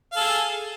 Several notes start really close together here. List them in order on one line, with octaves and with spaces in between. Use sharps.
F5 A4 G#4